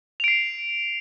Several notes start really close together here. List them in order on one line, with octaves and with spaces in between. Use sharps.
F7 D7 C7